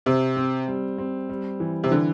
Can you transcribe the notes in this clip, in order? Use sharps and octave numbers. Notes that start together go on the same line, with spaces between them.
C3 C4
C4
G3
C4
G3
E3
C3
D3 E3